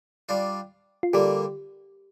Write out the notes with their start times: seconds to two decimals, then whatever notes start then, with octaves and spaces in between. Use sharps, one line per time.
0.29 G3 D4 F4
1.03 F4
1.13 D3 G3 A#3 G4